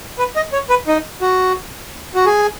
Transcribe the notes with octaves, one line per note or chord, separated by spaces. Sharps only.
B4
D#5
C#5
B4
D#4
F#4
F#4
G#4